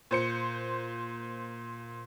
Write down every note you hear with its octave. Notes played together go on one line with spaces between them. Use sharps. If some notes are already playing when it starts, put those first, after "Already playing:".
A#2 C5 C#7